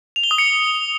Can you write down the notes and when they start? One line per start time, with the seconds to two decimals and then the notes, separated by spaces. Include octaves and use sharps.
0.16 F7
0.23 G7
0.31 D#6
0.38 C#7